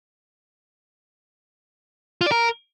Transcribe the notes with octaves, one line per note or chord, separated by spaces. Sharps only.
F4
D5
A#4